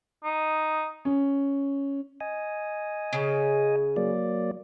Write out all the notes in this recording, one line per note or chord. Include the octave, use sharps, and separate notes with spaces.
D#4
C#4
D#5 G#5
C#3
F#3 A#3 D5